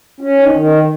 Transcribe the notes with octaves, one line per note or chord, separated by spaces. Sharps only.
C#4
D#3
D#3